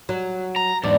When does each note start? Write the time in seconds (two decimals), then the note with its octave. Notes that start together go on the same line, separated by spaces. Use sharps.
0.09 F#3
0.56 A#5
0.84 E2 G#2 D4